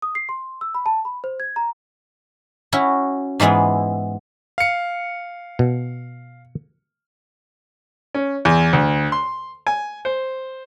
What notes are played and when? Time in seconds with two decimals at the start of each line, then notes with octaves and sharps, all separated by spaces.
0.02 D#6
0.15 C7
0.29 C6
0.61 E6
0.75 B5
0.86 A5
1.05 B5
1.24 C5
1.40 G#6
1.56 A#5
2.72 C#4 E4 F#4
3.40 G#2 E3 G#3 B3 E4
4.58 F5 C#7
5.59 B2
8.14 C#4
8.45 E2
8.73 D2
9.12 C6
9.67 G#5
10.05 C5